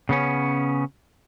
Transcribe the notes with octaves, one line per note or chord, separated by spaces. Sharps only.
C#3 B3 C#4